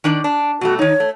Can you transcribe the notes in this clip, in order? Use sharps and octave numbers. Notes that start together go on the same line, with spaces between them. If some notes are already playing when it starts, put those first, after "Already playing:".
D#3 D4 D5
D4
B2 G3 A3 F#4
D#3 D#4 C#5
A3